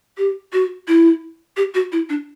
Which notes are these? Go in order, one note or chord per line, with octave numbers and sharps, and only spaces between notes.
G4
F#4
E4
G4
F#4
E4
D4